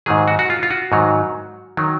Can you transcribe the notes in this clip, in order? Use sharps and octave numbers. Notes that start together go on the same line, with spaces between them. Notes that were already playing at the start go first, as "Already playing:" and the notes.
G#2 D#3 F#3 G#4
F#4
F#4
F4
F4
F#4
G#2 D#3 F#3
D#3 F#3